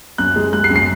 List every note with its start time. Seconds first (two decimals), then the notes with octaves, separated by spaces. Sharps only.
0.18 F#2 F#6
0.36 G#3
0.53 G#3 F#6
0.64 C7
0.70 F#2
0.76 C7